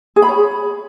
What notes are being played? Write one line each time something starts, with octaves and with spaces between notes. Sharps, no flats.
G#4
B5
C#5